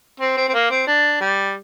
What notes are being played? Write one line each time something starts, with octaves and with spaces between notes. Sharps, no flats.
C4
C4
C4
A#3
C4
D4
G3